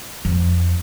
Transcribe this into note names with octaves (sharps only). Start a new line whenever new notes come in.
F2